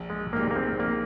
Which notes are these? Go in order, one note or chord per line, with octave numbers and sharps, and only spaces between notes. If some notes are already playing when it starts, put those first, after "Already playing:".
Already playing: A#1
G#3
A#2 G#3 A#3 D#4 G4
A#3
C4
A#1 A#3